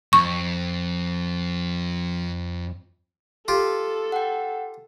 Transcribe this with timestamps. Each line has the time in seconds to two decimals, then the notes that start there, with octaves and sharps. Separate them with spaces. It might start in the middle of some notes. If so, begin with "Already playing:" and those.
0.13 F2 C#6
3.48 F4 G4 A4
4.12 F#5 G5